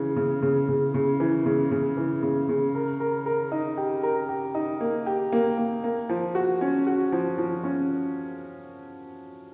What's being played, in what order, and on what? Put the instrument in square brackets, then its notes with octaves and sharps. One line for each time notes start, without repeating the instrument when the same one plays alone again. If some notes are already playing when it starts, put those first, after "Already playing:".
Already playing: [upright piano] C#3 E3
C#3
C#3
C#3
C#3
E3
C#3
C#3
E3
C#3
C#3
A#4
A#4
A#4
D#4
G4
A#4
G4
D#4
A#3
G4
A#3
A#3
A#3
F3
F#4
C#4
F#4
F3
F3
C#4